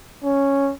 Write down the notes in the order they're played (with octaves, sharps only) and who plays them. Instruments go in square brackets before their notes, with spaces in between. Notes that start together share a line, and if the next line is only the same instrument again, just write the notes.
[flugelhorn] C#4